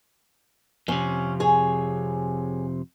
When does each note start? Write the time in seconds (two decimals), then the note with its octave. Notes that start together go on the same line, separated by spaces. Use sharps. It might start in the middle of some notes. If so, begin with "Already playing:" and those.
0.88 F2 C3 C#4
1.40 G#4 C#5 G#5